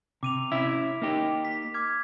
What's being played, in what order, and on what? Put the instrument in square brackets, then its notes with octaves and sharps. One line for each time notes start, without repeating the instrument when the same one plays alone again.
[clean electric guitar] C3 [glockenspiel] D6 D#7 F7
[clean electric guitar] C#4 E4 E5 [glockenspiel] B6
[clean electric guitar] A#3 D#4 G4
[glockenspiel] B6
D6 F6 G#6